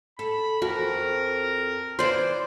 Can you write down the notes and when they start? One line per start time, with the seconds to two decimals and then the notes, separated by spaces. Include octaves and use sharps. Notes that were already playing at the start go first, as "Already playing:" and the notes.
0.19 A4 B5
0.62 F2 F#4 A#4
1.99 E3 B3 F4 C5 D5 C6